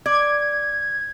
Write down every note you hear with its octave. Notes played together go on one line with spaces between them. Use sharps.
D5 G#6